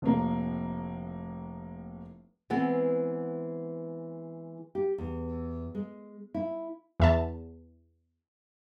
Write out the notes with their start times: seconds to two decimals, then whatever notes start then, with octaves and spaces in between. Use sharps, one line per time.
0.02 F1 A2 A#3
2.50 E3 G#3 B3 C4
4.75 G4
4.98 E2
5.75 G#3
6.34 E4
7.00 E2 E5 A5